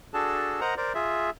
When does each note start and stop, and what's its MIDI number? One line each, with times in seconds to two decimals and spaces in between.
0.14 0.60 62
0.14 0.60 66
0.14 0.60 68
0.14 0.60 69
0.14 0.60 81
0.61 0.75 70
0.61 0.75 72
0.61 0.75 75
0.61 0.75 78
0.61 0.75 82
0.77 0.93 70
0.77 0.93 72
0.77 0.93 74
0.95 1.30 65
0.95 1.30 68
0.95 1.30 76